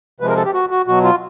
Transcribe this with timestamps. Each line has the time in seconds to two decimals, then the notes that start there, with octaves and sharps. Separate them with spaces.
0.20 C3 F3 G#3 B4
0.28 A#4
0.37 A4
0.45 G4
0.54 F#4
0.70 F#4
0.87 B2 F#3 F#4
1.04 F4